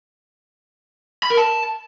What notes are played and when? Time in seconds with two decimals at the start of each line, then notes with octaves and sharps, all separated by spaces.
1.23 B5
1.30 A#4
1.37 A5